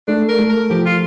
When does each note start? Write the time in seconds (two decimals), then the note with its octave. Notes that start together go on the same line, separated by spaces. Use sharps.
0.08 A3 D4
0.29 A#4
0.39 A3
0.49 A#4
0.70 F3 G4
0.86 F4